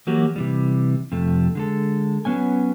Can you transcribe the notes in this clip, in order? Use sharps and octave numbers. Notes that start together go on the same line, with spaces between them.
E3 F#3 A#3 F#4 G4
C3 E3 G3
F2 C3 A3
D3 G#3 A4
F#3 B3 C#4 G#5